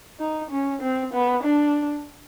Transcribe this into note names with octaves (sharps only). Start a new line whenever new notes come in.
D#4
C#4
C4
B3
D4